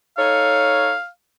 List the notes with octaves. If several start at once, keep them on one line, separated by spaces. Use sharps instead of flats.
D#4 A4 C#5 F5